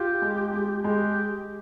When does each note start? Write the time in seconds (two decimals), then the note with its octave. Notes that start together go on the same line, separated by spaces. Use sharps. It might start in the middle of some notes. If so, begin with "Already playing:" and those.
Already playing: F4 G4
0.22 G#3
0.53 G#3
0.84 G#3 G4